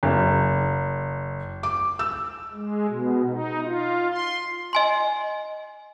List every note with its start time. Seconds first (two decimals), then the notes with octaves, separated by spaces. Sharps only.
0.03 F#1
1.63 D6
1.99 E6
2.52 G#3
2.88 B2
3.29 D#4
3.64 F4
4.11 C6
4.73 D#5 G#5 C6